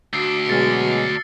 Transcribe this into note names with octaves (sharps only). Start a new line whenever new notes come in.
D2 D4 F#4 E6 C7
B2 F#3 G#3 F6 A6 C#7